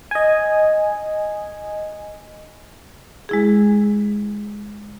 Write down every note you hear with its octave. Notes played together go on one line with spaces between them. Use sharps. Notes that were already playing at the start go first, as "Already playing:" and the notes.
D#5 G#5
G#3 E4 G#4